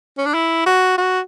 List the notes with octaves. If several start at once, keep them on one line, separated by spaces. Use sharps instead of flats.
C#4
D4
E4
F#4
F#4